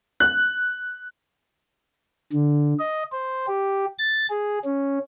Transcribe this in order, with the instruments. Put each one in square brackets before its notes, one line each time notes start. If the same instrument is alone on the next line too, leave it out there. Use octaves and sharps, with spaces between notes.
[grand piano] F#6
[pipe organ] D3
D#5
C5
G4
A6
G#4
C#4